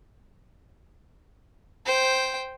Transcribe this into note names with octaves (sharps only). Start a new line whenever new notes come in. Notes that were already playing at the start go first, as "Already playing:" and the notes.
C5 G5